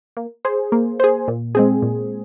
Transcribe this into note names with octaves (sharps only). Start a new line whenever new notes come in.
A#3
G#4 C5
A#3
G#4 C5
A#2
G#3 C4 G#4
A#2